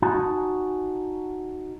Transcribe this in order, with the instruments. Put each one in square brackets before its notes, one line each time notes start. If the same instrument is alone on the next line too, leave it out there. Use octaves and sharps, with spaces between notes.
[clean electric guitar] D#4 F#4 G#5 A5